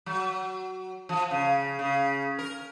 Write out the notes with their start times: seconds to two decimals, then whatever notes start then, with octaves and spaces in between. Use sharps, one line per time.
0.06 F#3
1.09 F3
1.31 C#3
1.79 C#3
2.39 A#4